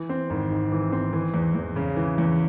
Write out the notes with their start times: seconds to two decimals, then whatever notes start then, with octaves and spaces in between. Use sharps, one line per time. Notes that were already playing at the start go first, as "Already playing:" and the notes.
Already playing: E3
0.09 C4
0.30 G#1
0.50 G#2
0.72 E3
0.92 C4
1.13 E3
1.34 E2
1.55 E2
1.76 C#3
1.96 E3
2.18 E2